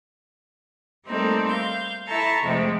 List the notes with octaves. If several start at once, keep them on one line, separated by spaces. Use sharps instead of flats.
G3 A3 A#3 C4 D#4 A4
F5 G6
E4 A4 E5 A5 A#5 C#6
F2 C3 F3 G#3 A3 C4